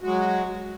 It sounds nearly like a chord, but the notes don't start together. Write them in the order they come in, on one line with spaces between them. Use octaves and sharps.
F#4 G#3 F#3